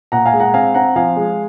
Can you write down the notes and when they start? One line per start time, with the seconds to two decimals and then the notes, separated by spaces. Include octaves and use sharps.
0.12 A#2 F#5 A#5
0.26 F5 G#5
0.34 G#3
0.40 F#5 A#5
0.54 C4 F5 G#5
0.74 C4 F#5 A#5
0.96 F3 F5 G#5
1.16 G#3